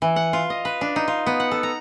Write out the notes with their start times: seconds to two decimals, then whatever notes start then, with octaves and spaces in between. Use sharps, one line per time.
0.02 E3
0.16 F#5
0.33 F4
0.50 D#5
0.65 B4
0.81 D4
0.96 D#4
1.08 F4
1.27 B3
1.40 F#5
1.51 A4
1.63 A#5